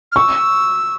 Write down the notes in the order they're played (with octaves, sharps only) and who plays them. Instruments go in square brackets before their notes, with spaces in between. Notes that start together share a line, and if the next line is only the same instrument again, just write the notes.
[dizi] F6
[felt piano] C#6 [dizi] E6